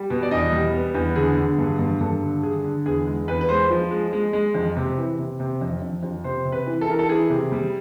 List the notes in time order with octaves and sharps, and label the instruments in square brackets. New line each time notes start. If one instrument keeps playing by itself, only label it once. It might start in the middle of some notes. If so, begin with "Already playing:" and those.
Already playing: [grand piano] G3
B2
D5
E2 D#5
G3
B3
E2
D3 G#4
D3
G2
G2
G2 A4
D3
D3 G#4
D3
E2 G#4
G#3
E2 B4
B4
G#3 C5
F3
G#3
G#3
G#3
F2
C3
E3
C3
C3
F2
F2
F2
C3 C5
C3
B4
E3
A4
E3 A#4
A4
E3 G#4
C3
G3